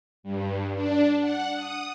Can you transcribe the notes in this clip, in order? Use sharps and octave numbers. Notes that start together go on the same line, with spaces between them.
G2
D4
F#5
D#6